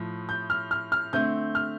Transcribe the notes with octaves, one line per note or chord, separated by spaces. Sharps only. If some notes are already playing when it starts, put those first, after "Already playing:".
Already playing: A2 F3
G6
F6
F6
F6
D3 A3 C4 G6
F6